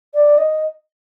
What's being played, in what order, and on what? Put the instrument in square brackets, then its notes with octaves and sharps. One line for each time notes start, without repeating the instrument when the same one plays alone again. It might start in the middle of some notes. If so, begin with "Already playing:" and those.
[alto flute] D5
D#5